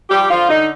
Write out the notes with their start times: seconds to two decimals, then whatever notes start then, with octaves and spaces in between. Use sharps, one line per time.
0.10 F3 G3 G4
0.30 D3 F3 F4
0.49 D3 D#4